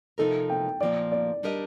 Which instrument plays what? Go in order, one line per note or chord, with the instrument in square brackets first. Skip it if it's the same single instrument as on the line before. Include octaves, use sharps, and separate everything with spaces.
[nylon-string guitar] C3 F3 A3 D#4 A#4 [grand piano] A4
[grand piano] G5
[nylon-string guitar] A#2 F3 A#3 [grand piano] D5
[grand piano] D5
[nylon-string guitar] G3 D4 G4 A#4 D#5